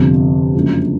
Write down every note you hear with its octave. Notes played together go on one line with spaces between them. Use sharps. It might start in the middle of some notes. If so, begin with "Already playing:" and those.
Already playing: G1 F2 C3
F#1 F#2 D3 F3 G#3